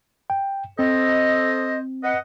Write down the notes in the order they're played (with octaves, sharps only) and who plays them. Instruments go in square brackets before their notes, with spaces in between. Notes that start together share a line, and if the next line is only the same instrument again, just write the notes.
[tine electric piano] G5
[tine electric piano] C4 [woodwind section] A4 C5 D#5
[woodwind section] B4 D#5 F#5